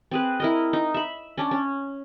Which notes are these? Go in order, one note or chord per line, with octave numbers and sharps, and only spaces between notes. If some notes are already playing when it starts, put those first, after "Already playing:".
C4 G#4 B4
E4 A#4 D#5
D#4
E5 B5
C#4 D4
C#4